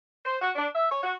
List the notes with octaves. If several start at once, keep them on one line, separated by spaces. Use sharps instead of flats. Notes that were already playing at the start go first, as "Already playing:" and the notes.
C5
F#4
D4
E5
C#5
F#4